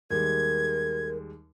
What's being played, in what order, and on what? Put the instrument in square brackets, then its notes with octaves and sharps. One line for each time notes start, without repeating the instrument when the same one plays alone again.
[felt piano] D#2 G3 G#3 [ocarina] A#4 [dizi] G#6